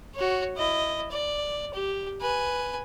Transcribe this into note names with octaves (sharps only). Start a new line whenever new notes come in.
F#4 C#5
E4 D#5
D5
G4
B4 G#5